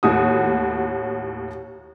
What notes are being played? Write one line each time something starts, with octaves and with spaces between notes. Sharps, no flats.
D#2 A2 F#4 D#6